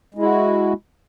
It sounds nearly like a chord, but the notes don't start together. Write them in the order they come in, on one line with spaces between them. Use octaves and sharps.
G#3 E4 F#4